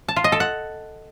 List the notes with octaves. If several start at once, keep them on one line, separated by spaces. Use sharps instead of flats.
A5
F4
D#5
A4
F#5